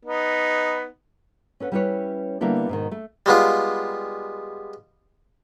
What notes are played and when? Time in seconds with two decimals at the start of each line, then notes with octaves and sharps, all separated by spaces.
0.06 B3 D#4
1.60 C#4 A4 B4 F#5
1.72 G3 B3 C#4 E4 B4 C#5
2.41 D3 G3 A#3 B3 E4 A4
2.69 G#2 B2 D#3
2.91 A3
3.26 G3 G#3 B3 F4